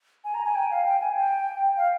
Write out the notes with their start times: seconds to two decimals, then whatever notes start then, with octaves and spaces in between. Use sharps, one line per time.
0.24 G#5
0.34 A#5
0.45 G#5
0.55 G5
0.71 F5
0.86 G5
1.00 G#5
1.17 G5
1.77 F5